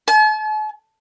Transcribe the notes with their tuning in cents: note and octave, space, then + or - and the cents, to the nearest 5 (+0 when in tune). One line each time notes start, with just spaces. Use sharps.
A5 -45